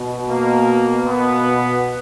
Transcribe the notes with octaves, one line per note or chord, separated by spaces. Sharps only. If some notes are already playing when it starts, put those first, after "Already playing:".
Already playing: B2
A#3
B3